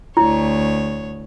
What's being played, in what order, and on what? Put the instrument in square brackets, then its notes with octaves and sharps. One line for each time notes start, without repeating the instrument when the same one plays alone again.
[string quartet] D2 C#5 [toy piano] E4